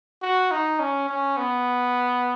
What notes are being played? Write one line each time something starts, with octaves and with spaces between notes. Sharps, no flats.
F#4
D#4
C#4
C#4
B3